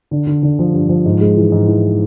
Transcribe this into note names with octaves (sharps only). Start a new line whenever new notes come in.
D3
D3
D3
F3
G2
F3
G#2
G#3
E3
G#2
E3